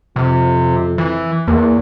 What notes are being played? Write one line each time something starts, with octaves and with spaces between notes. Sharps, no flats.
F2 C3
E3
E2 A#3